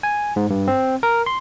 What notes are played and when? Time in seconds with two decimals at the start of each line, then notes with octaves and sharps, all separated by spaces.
0.03 G#5
0.36 G#2
0.50 G2
0.68 C4
1.03 A#4
1.26 C6